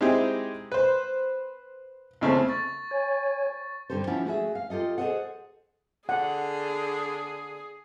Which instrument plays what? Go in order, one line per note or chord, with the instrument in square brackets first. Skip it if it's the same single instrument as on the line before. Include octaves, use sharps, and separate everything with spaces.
[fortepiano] G#3 C4 D#4 E4 G4 G#4
B4 C5
E2 C#3 A3 C4
[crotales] C#6 A6
[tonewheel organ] C#5 G#5
[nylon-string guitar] G2 D3 G4 A4 C5
F3 C#4 E4 F#5 A5
A3 F#4 G#4 E5
F5
F4 G4 A4 D#5
G#4 A4 B4 C5 D#5 F#5
[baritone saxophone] D3 [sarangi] G#4 [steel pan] F#5